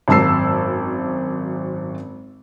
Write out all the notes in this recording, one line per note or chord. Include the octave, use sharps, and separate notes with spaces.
G#1 F#2 A5 E6 C7